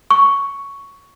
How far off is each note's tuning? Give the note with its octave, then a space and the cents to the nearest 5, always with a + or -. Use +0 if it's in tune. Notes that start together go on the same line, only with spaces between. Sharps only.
C#6 +5